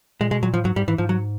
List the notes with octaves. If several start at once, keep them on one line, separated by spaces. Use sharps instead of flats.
A#2 G#3
B2 G#3
A#2 F#3
A2 F3
G#2 F#3
G#2 G3
G#2 E3
G#2 F3
F#3